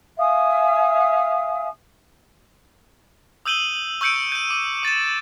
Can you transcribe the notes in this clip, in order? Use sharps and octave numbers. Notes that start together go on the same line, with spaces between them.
E5 F5 G#5 D#6
D#6 E6 G6 D#7 F#7 G7
C#6 E6 G6 C#7 D7
G6 D#7
D6
D6 A6 D#7 E7